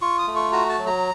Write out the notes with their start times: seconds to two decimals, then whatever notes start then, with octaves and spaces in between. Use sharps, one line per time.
0.02 F4 C#6
0.19 D#6
0.27 A3
0.36 C#6
0.53 F#4 A#5
0.69 A5
0.79 F#3
0.87 A#5